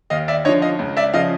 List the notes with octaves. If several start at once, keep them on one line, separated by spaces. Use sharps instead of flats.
D#2 D#5 F5
D5 E5
D3 F3 C#5 D#5
D#5 F5
C#2
D5 E5
C#3 F3 D#5 F5